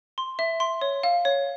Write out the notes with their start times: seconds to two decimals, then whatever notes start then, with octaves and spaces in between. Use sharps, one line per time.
0.18 C6
0.39 E5
0.60 C6
0.81 C#5
1.03 F5
1.25 C#5